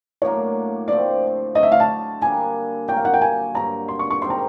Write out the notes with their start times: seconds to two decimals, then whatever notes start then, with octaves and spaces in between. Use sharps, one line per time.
0.22 A2 F#3 A#3 D4 C#5
0.88 D3 F3 A3 C4 D5
1.55 D3 F#3 A3 D4 D#5
1.63 E5
1.72 F5
1.80 A5
2.21 D3 G3 A#3 D4 G#5
2.88 A#2 F#3 A#3 G5
2.96 F5
3.05 F#5
3.14 G5
3.21 G#5
3.55 G2 D3 F#3 A#5
3.88 C6
3.99 C#6
4.10 C#6
4.22 G#2 D#3 G3 C4 C6
4.30 A#5